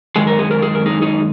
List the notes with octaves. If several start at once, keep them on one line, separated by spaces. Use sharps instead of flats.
F#2 D#3 G#3 G#4
A#4
G#4
A#4
G#4
A#4
D#4 G#4
D#4 G#4